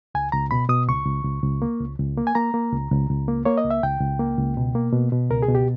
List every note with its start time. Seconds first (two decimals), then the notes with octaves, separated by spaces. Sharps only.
0.15 C#2 G#5
0.32 C#2 A#5
0.51 B2 B5
0.69 B2 D#6
0.89 C#2 C#6
1.06 C#2
1.24 C#2
1.43 C#2
1.62 A#3
1.80 C#2
1.98 C#2
2.18 A#3
2.27 G#5
2.35 A#3 A#5
2.54 A#3
2.72 C#2
2.91 C#2
3.10 C#2
3.28 A#3
3.45 A#3 C#5
3.58 D#5
3.64 C#2
3.71 E5
3.83 C#2 G5
4.01 C#2
4.19 A#3
4.38 C#2
4.57 B2
4.75 A#3
4.93 B2
5.12 B2
5.31 C#2 A#4
5.42 G#4
5.48 B2
5.55 G4